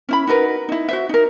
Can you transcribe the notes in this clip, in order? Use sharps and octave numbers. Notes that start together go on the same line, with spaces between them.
C#4 E4 B5
D#4 F#4 A#4 B4
D#4 E4
F#4 C5 E5
D#4 A#4